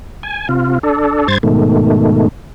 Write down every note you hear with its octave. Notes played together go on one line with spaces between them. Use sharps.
G#5
C3 F4
D4 A4
G2 C5 G#6 A6
G#2 B2 D#3 A3